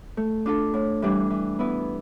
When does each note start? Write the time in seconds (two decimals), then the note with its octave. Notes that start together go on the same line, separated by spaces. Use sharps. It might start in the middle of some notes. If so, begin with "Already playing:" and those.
0.17 A3
0.46 D4 F4 A4
0.74 A2
1.02 E3 G3 D4
1.30 E3
1.59 B3 E4 B4